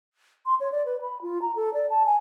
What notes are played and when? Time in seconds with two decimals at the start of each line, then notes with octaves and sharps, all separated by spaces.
0.46 C6
0.60 C#5
0.72 D5
0.85 B4
1.01 B5
1.22 F4
1.42 A#5
1.56 A4
1.74 D5
1.90 A5
2.06 G#5